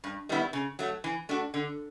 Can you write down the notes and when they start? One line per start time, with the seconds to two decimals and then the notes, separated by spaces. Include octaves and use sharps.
0.04 G2
0.29 D#3 G3 B3 E4
0.53 C#3
0.79 F#3 A3
1.04 E3
1.29 A3 D4 F#4
1.54 D3